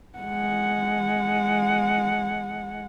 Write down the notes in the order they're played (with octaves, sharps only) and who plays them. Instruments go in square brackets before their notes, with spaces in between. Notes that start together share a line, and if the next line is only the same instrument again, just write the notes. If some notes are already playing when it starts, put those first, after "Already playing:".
[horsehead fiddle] G#3 F#5